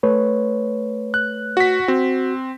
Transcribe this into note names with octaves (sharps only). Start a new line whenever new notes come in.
A3 B4 C#5
F#6
F#4 B6
C4 F#4